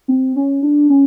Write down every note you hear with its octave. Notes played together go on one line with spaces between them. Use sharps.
C4
C#4
D4
C#4